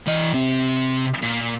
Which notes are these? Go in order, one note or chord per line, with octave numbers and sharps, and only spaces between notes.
E3 D#5
C3 C4
A#2